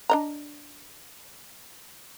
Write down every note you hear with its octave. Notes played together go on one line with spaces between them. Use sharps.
D4 D#5 A#5